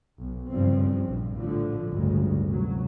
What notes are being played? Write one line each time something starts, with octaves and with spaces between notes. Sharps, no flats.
B1
F#1 G2 C#3 F3 C4
A#1 G2
A2 D3 F3
A1 D2 G2 C#3 G#3
F1 F#3